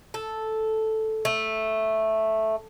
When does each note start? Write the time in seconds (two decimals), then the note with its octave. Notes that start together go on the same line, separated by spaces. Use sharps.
0.14 A4
1.25 A3